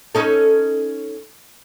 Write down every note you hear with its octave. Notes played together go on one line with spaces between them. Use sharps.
C#4 D#4 A4